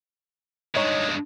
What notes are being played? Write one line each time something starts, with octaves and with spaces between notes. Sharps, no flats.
G2 G#3 D#4 C#5